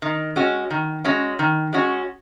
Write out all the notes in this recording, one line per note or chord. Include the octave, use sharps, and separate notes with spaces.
D#3
G#3 C#4 F#4
D#3
G#3 C#4 F#4
D#3
G#3 C#4 F#4